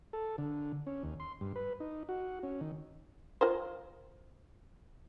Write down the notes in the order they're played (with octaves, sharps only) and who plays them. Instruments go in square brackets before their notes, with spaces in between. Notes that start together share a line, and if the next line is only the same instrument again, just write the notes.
[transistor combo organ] A4
D3
C#4
D#2
C6
G2
B4
D#4
F#4
C#4
D#3
[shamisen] F4 A#4 C5